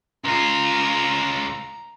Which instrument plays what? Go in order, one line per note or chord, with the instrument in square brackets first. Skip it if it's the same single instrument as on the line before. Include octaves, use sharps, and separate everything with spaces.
[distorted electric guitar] C#2 F4 [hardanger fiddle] A#5